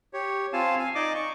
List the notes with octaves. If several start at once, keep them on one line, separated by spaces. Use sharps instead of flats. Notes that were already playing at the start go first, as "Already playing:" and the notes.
G4 C#5
C4 F4 F5 G#5 A5
F5 G#5
D#4 D5 D#5 D6
C#6